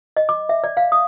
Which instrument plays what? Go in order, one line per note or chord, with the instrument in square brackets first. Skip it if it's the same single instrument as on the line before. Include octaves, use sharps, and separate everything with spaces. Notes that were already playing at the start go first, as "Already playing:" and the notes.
[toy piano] D#5
D6
E5
D5
F5
D#6